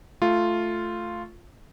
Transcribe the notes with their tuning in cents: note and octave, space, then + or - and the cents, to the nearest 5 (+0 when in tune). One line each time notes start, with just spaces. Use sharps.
A3 +0 F4 -5